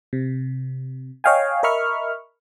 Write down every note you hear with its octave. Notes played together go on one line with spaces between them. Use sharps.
C3
C#5 D#5 F5 G5 G#5
A#4 D#5 E5 B5 C#6 F6